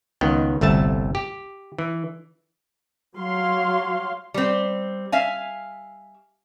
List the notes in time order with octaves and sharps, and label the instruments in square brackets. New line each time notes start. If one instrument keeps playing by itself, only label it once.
[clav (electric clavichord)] C#2 D#3 B3 G5
G1 C2 A3 E5 A5
G4
E3
[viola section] F#3 F5 C6
[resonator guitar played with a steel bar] G3 C4
E5 F5 G#5